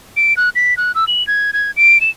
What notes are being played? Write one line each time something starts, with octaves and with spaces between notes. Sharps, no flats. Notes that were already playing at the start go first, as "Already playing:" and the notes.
D7
F#6
B6
F#6
E6
F#7
G#6
G#6
D7
E7